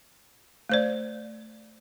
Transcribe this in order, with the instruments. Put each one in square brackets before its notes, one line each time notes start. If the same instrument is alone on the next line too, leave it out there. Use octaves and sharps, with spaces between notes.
[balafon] A3 C5 D5